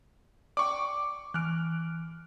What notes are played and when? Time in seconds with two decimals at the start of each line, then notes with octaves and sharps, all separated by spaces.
0.57 D5 G5 C#6 D6
1.34 E3 F6 F#6 D7